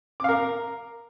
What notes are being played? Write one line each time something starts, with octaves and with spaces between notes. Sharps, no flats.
A#4 F5 D6